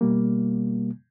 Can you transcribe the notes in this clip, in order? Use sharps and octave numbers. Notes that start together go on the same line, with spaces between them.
B2 G3 A#3